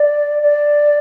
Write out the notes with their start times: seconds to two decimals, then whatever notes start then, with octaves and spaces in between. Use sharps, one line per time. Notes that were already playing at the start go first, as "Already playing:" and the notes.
Already playing: D5
0.43 D5